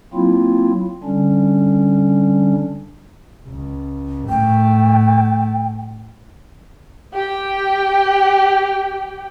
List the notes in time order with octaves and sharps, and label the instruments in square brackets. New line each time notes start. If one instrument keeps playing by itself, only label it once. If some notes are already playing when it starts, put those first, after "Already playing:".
[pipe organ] F#3 A#3 C4 E4 F4
D3 G3 C#4 D4
[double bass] C#2
[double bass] A2 A3 [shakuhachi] G5
[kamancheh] G4 G5